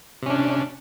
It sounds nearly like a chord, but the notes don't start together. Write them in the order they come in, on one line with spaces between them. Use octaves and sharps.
C3 C#4 D4